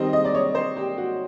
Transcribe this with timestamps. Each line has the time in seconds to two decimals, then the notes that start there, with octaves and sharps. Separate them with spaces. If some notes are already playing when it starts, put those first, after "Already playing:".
Already playing: D#3 G3 C4 D#5
0.13 D#5
0.25 D5
0.35 C#5
0.55 C5
0.77 G4
0.98 F#4